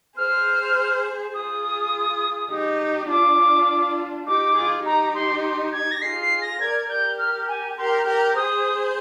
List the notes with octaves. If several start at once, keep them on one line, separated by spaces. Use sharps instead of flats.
G#4 C5 F6
F4 G#4 D#6
D#4 G4
D4 F4 D6
D#4 G4 D6
F4 G#4
D#4 G4 A#5
C6
C6
G#6
A#6
F4 G#4 C7
C7
A#6
A#4 D5 G#6
G4 A#4 G6
F6
G#5
G4 A#4 C6
G4 A#4
G#4 C5 D#6